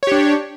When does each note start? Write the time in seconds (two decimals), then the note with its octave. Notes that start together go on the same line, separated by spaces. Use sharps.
0.03 C#5
0.07 G4
0.12 D4